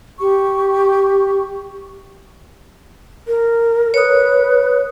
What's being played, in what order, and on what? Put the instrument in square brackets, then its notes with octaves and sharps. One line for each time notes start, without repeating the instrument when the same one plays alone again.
[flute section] G4 C#6
[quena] A#4
[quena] B4 [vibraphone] C#5 D#6